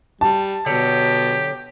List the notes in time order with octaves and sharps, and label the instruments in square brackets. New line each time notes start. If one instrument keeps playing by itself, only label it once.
[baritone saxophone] G3 [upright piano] A5
[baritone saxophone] B2 [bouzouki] D3 F#3 C#5 [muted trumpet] G4